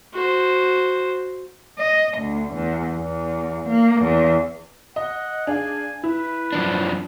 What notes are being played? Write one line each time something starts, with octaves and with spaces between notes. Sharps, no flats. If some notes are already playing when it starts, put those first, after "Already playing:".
F#4 C5
D#5
D2
E2
E2
A#3
E2
D#5 F#5
D4 G#4 F5 G#5
E4 B4
F#2 F3 D4